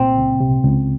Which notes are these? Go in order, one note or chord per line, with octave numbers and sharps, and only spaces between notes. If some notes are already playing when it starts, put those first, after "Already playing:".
Already playing: C2 A#2 C4
C#2
C3
C#2